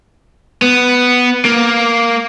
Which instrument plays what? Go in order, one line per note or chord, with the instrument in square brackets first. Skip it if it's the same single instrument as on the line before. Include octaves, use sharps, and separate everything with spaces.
[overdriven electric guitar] B3
A#3